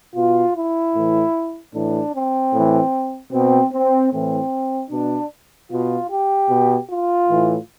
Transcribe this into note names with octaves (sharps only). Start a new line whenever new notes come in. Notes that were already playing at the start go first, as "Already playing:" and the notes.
B2 F4
E4
A2 E3
A2 E3 D4
C4
A2 E3
B2 C4
C4
A2 E3 C4
B2 D4
B2 F4
G4
B2
F4
A2 E3